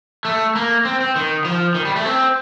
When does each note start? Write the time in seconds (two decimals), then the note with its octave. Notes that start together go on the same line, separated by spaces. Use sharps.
0.25 A3
0.55 A#3
0.85 C4
1.01 C4
1.16 D#3
1.45 F3
1.75 D#3
1.85 G3
1.96 A3
2.06 C4